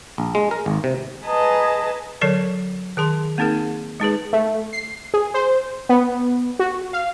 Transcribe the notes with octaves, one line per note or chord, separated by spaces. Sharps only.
A#1
G#3
A#4
G#1
C3
G#4 B4 D#5 A5 A#5
D3 F#3 A#4 C#5 D5
D#3 G#4 A5 C6
A#3 C4 D#4 G#4 A#4
G#3 D#4 G#4 B4
A3
C7
G#4
C5
B3
F#4
F5